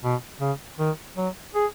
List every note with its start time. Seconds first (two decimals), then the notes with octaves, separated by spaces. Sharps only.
0.04 B2
0.41 C#3
0.79 D#3
1.17 F#3
1.55 G#4